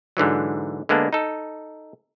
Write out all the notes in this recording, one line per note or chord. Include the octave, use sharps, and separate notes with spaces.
G#2 D3 E3 F#3
D3 G#3 A#3 B3 D4
D#4 A4